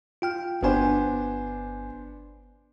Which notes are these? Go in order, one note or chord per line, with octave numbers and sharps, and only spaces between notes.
F4 G5 F6
G1 B3 D4 C5 G#5